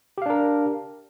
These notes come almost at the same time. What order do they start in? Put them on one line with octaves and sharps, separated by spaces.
G4 F5 D4 A#4